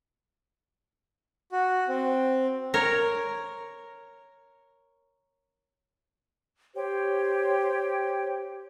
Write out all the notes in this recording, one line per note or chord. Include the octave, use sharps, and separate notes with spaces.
F#4
C4
A#4 C#5
G4 C5 C#5 G5